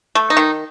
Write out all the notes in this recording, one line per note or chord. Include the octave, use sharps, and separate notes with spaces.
A3
D#4
D#3